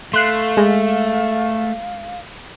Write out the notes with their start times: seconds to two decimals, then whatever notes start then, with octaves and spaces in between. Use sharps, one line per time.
0.14 A3 F5 C6 F#6 C7
0.57 G#3